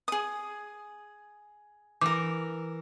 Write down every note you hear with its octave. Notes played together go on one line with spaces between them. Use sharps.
G#4 D#6
E3 A#4 D6